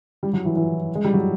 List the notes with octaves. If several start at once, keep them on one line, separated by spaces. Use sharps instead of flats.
G3
F#3
E3
E3
G#3
G3
F#3